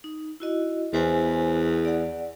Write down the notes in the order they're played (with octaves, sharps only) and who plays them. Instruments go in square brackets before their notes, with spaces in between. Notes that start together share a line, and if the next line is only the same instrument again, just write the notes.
[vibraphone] D#4
E4 F#4 D#5
[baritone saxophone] E2 [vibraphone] C5 G#5
[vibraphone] D5 F#5